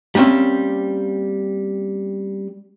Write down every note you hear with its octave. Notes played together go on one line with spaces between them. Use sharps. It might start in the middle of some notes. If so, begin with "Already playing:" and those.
G3 A#3 C4 C#4 E5